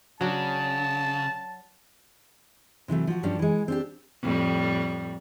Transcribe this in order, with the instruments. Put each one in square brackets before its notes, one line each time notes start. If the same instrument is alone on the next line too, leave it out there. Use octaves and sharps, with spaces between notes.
[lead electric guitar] C#3 [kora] F#3 D4 [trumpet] A5
[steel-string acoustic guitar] C3 E3 F#3 A3
F3 F#4
G2 F3 C#4 D4
E3 G#3
C4 D4 G4
[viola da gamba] F2 A2 G3